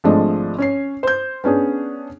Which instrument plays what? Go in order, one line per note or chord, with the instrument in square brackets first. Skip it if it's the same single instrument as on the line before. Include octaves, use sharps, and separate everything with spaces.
[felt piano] G#1 F3 G#3 A3 D4 D#5
C#4 C#5 C7
C5 G6
B3 C#4 D4 G#4